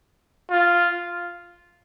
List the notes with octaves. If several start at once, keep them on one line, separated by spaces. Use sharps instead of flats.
F4